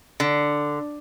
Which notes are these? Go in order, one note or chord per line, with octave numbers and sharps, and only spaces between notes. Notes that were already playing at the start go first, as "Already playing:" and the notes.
D3